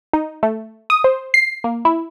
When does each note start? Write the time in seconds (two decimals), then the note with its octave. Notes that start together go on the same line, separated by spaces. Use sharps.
0.13 D#4
0.43 A3
0.90 D#6
1.04 C5
1.34 C7
1.64 A#3
1.85 E4